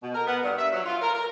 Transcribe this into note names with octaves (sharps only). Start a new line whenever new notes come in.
B2
A#4
B3
G2
E5
F#3
F4
A#4
A#4